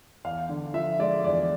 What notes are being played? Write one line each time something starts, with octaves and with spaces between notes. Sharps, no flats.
E2 F5
D3
F3 E5
G#3 D5
E2 D5